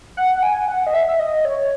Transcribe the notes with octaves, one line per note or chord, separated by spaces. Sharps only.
F#5
G#5
F#5
D#5
E5
E5
D#5
C#5